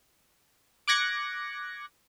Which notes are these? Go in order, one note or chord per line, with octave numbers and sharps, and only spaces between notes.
D6 F#6 G#6 A#6 C#7